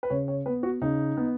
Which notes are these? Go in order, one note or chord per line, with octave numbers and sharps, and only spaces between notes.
B4
C#3 C#5
C#5
B3 B4
F#4
C#3 D#4
B3